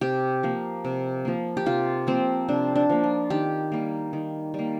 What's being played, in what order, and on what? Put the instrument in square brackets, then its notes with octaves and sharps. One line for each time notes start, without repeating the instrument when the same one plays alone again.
[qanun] C3 G4
F3 A#3
C3
F3 A#3
G4
C3 F4
F3 A#3 C4
C3 D4
D4
F3 A#3
F4
D#3 G4
G3 A#3
D#3
G3 A#3